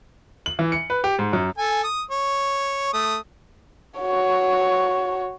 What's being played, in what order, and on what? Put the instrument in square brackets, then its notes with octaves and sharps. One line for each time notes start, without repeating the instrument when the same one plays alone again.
[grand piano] F#7
E3
C#7
B4
G4
G#2
F#2
[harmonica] A4 G#5
D#6
C#5
A3 D#6
[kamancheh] F#4 C#5